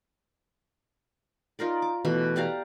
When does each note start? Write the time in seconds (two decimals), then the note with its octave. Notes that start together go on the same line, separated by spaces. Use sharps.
1.59 D#4 F4 A#4 D5
1.82 D6
2.05 B2 E3 A3 B5
2.36 G4 D5 F5 A#5